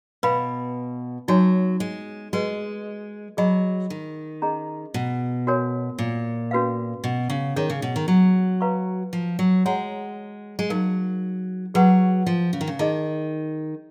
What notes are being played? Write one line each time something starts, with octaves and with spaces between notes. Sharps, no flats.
B2 B4 F5 B5
F#3 D#4 F#4 C#5 G#5
G#3
G#3 F#4 B4 D#5
F#3 G#4 D#5 G#5 B5
D#3
C#4 G#4 D#5 A#5
B2
F#4 A#4 C#5 G#5
A#2
C#4 F#4 B4 F5
B2
C#3
D#3 C#4 G#4 C#5
C#3
B2
D#3
F#3
F#4 B4 F5 A#5 C#6
F3
F#3
G#3 F#4 C#5 F#5 A#5
G#3
F#3 D#4 A#4 F5
F#3 G#4 B4 F#5 C#6
F3
C#3
D#3
C#3
D#3 D#4 G#4 D#5